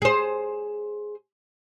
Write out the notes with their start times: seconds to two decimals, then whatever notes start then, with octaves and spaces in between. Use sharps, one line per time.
0.02 G#4 C5